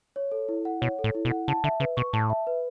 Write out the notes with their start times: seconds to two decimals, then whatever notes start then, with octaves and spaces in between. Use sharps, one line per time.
0.16 C#5
0.32 A4
0.49 E4
0.65 F#5
0.81 B2 C#5
0.99 A4
1.04 A2
1.15 E4
1.25 B2
1.31 F#5
1.48 C#3 A5
1.64 D3 E5
1.80 C#3 B4
1.97 B2 C#6
2.13 A2 A5
2.30 E5
2.47 B4